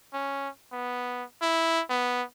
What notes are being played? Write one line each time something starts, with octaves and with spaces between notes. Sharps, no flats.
C#4
B3
E4
B3